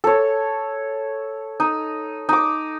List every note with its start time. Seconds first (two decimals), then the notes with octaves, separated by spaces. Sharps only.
0.04 A4 C#5
1.60 D#4
2.29 D#4 D6